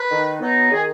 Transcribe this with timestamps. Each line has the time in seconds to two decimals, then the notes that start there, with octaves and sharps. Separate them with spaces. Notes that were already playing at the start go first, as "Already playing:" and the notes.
Already playing: B4
0.11 D#3
0.41 F#3 B3 D#4
0.71 D#3 G#4